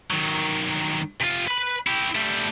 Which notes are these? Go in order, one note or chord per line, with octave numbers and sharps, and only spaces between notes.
D#3 F#3
C3 F4
B4 B5
E4 G4
G3 A3